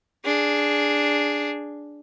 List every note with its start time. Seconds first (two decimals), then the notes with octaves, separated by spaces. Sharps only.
0.24 D4 G#4